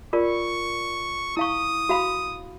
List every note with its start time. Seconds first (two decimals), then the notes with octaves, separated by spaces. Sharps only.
0.13 F4 A#4 D5 C#6
1.37 E4 F5 C#6 D#6
1.89 F#4 F5 B5